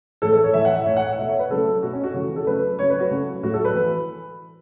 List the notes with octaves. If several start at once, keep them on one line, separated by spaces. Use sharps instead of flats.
A2 E3 A3 A4
A4
C#5
A2 E3 A3 E5
F#5
E5
A2 A3 C#5
F#5
F#5
B2 A3 E5
C#5
B4
C#3 F#3 A3 A4
B2 A3 F#4
C#4
F#4
C#3 E3 A3 F#4
A4
C#3 F#3 A3 B4
C#3 F#3 A3 C#5
B4
F#4
C#3 F#3 A3
A2 F#3 A3 F#4
A4
B4
E3